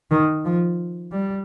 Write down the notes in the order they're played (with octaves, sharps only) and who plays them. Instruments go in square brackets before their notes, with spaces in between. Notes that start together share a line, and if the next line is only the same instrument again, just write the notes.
[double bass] D#3
F3
G3